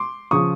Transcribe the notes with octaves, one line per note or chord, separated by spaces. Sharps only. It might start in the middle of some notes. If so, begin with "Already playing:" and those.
Already playing: C6 D6
C#3 F3 C#6 D#6